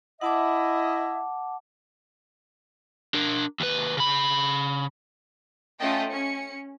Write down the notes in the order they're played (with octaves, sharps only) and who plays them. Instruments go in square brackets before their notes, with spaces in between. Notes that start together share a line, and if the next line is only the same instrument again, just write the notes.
[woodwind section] E4 D#5 E5 [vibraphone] F#5 A5 D6
[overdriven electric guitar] D4 A#4
D#2 B4
C#3 B5
[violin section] A3 C#4 F4 D#5 G5 A5
C#4 C#7